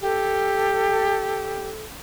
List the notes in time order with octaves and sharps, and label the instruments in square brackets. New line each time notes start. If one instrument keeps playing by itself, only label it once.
[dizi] G4 [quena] A4